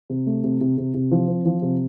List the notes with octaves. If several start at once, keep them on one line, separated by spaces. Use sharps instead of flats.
C3
A3
C3
C3
C3
C3
F3
C4
F3
C3